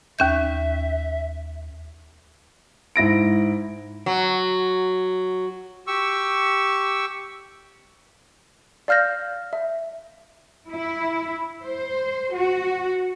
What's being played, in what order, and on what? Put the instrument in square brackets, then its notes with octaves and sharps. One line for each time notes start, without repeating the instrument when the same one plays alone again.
[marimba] D#2 C#4 G6 [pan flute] E5
[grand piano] G#2 E4 A#6 D7
[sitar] F#3
[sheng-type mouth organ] G4 C#6 E6
[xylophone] D5 F5 F6 G6 A#6
E5
[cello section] E4
C5
F#4